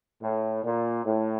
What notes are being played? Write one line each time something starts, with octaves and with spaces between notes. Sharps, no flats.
A2
A#2
A2